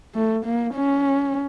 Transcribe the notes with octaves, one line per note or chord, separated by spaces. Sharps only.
A3
A#3
C#4